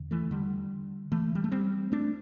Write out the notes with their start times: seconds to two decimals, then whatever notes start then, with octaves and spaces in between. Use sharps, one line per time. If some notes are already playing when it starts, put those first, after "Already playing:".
Already playing: E2 D3
0.11 E3 A3
0.31 D3 G3
1.12 E3 A3
1.35 G3
1.44 A3
1.52 G3 C4
1.92 A3 D4